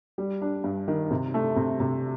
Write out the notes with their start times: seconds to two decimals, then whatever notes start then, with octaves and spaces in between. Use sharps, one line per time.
0.18 G3
0.42 D4
0.64 G2
0.88 D#3
1.11 C3
1.34 A3
1.56 C3
1.80 C3